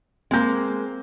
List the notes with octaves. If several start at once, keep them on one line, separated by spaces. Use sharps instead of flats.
G#3 A#3 C4 G6